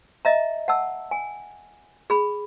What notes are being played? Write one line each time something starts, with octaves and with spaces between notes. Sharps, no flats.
D#5 E5 A#5
F#5 A5 E6
G#5
G#4 B5